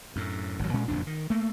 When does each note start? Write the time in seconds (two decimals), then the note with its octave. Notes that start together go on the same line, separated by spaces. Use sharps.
0.16 F#2 A2
0.60 G#1 F#2 F#3
0.74 A#2 G#3 C#4
0.88 F#1 F2 A#2 D4
1.07 D#3
1.30 A3 A#3